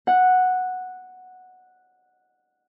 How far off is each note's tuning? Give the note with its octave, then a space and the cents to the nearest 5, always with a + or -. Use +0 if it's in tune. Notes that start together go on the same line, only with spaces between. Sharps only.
F#5 -5